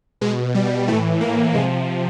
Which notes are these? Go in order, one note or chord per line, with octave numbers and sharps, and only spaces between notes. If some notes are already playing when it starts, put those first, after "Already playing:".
B2 G#3
G3
A2 E3 A3
A#3
C3 F3 G#3